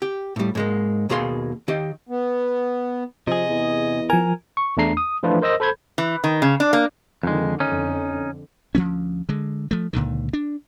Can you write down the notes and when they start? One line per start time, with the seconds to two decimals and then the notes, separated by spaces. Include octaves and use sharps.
0.02 G4
0.36 A2 G3
0.55 G#2 G#3 A#3
1.09 D#2 B2 A#3 G#4 F5 C6
1.68 D#3 G4 D#5
2.09 B3
3.27 C3 F3 G#4 D#5
3.49 E2
4.10 F3 A#4 G#5
4.57 C#6
4.77 E2 A3 D4 A#5 C7
4.97 D#6
5.23 E3 F3 A3 D4 F4 B4
5.41 A#4 C5 D#5 E6 A#6
5.60 A4 C5 B5 G6 G#6
5.98 E3
6.24 D#3
6.42 C#3
6.60 D4
6.73 A#3
7.23 F2 D3 D#3 G#3
7.60 F2 D3 C#4 D#4
8.75 D2 F3 A3 C#4
9.29 D3 G#3
9.71 F3 A3
9.93 C#2 A#2 D3 D#3
10.33 D4